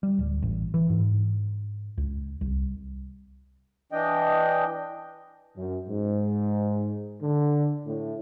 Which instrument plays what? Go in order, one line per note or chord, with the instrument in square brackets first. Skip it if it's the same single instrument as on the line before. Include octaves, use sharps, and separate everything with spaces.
[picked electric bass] G3
D1
A1
E3
G#2
C#2
C2
[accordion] E3 D4 D#5 G5
[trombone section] F#2
G#2
D3
A2